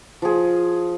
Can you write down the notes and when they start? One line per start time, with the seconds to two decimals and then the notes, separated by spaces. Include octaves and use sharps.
0.22 F3 G#4